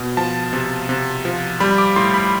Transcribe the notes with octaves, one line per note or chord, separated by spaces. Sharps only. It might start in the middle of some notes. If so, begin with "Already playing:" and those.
Already playing: B2
F3 A5
C3
C3
F3
G3 B5
D6
A2 C6
B5